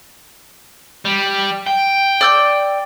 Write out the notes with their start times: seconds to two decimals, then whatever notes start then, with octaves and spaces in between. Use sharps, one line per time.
1.05 G3
1.67 G5
2.21 D5 E6 G6